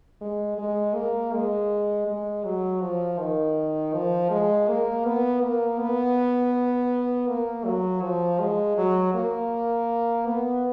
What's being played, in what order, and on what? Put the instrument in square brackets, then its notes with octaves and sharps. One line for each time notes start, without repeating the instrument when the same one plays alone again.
[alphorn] G#3
G#3
A#3
G#3
G#3
F#3
F3
D#3
F3
G#3
A#3
B3
A#3
B3
A#3
F#3
F3
G#3
F#3
A#3
B3